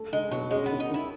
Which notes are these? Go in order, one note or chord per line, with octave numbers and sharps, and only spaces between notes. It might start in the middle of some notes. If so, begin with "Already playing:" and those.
Already playing: A3
G#3 D#4
B2 F#3
G#3 C#4
B3
D#3
D#4
D#3 E4